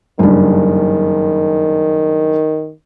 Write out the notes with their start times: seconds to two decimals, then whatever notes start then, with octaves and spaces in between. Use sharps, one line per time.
0.19 F#1 G2 D#3